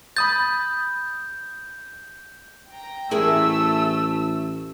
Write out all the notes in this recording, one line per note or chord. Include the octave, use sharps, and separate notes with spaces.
B5 D#6 G6 A6
G5 A#5
A1 A3 E4 G#4 A#4 E6